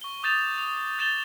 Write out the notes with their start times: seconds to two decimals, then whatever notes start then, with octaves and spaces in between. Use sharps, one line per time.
0.01 C#6 G7
0.23 D6 D#6 G6 A6 E7 F7
0.58 D#6 F7
0.99 G6 A6 E7 F7 G7